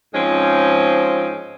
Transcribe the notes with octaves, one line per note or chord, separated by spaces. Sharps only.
G#2 F3 G#3 C4 C#4